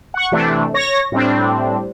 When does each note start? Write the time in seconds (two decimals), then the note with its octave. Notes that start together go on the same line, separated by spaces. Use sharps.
0.14 F#5 C#6
0.32 C3 E3 A3 D4
0.74 C#5 C#6 A#6
1.12 A2 G3 C4 D4